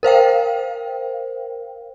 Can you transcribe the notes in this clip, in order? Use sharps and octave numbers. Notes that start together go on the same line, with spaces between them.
A#4 C5 F5 G5